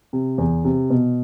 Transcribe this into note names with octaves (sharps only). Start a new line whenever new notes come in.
C3
E2
C3
B2